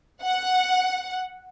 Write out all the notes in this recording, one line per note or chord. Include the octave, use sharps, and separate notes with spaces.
F#5